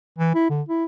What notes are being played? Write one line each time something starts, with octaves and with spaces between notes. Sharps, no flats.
E3
E4
D3
E4